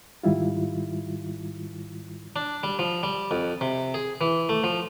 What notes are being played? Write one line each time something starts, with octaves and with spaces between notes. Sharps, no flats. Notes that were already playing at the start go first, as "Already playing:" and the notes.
G#2 D#3 G3 E4 F4
D4
G3
F3
G3
F2
C3
G#4
E3
A3
F3